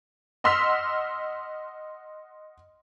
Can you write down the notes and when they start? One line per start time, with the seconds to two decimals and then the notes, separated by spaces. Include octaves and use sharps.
0.44 D#5 F#5 C6 E6 F6 B6